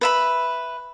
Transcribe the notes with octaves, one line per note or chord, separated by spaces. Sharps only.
B4 E5 B5